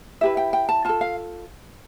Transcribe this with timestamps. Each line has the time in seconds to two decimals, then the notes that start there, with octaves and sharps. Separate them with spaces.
0.21 E4 G4 B4 E5
0.37 G5
0.53 G5
0.69 A5
0.85 F4 A4 A5
1.01 F5